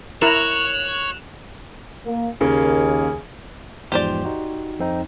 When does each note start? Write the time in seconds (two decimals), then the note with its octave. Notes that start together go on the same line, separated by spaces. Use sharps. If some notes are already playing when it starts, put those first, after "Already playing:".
0.22 E4 A#4 C#5 F#6 E7 F7
2.06 A#3
2.41 D#2 C#3 A#3 G#4
3.92 E2 G#2 F3 G4 C5 D5
4.25 D#4 F#4
4.79 F2 C4 D#4